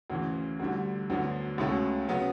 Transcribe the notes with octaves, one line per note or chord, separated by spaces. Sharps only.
D2 C#3 E3
D2 D3 G3
D2 D3 F#3 B3
C#2 B2 A3 C#4
C#3 F#3 B3